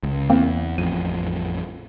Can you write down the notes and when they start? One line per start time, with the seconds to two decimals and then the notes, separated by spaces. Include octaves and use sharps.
0.03 C#2
0.30 E2 A#3 C4
0.78 A1 F2 D#7